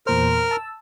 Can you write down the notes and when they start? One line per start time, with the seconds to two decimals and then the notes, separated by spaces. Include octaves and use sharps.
0.07 E2 A#2 A#4 C5 F6
0.51 A5 E6